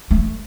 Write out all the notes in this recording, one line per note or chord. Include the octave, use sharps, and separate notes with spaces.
A3